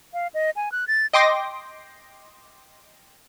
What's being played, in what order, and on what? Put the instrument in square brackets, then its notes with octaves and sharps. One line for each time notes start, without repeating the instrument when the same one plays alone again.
[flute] F5
D#5
G#5
F#6
A6
[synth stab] D#5 G5 C6 D6 A#6